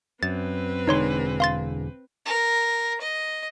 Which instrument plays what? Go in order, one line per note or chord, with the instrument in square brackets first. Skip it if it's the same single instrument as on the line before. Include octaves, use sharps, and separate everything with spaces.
[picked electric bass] F#2 [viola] C4 B4 [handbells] A6
[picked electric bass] E1 D3 G#3 [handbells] D#4 C#5 C6
[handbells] F5 C6 A6
[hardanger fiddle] A#4
D#5